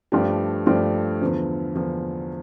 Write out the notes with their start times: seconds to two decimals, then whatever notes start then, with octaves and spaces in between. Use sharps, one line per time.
0.12 G2 F3 A3 D4 G4
0.66 G2 F3 A3 D4 G4
1.21 E2 D3 F3
1.75 E2 D3 F3